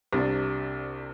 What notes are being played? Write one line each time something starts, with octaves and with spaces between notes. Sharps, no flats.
C2 C3 G3 D4